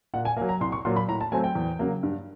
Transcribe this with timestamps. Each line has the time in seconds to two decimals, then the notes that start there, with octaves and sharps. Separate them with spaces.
0.14 A#2 F#5
0.25 G#5
0.37 A#3 G#5
0.41 F#3
0.49 A#5
0.60 C2 C6
0.72 C#6
0.85 A#2 F#3 A#3 C6
0.96 B5
1.08 A2 A#5
1.21 A5
1.32 F#3 A3 C4 G#5
1.44 G5
1.55 E2
1.79 C#3 F#3 A#3
2.03 G2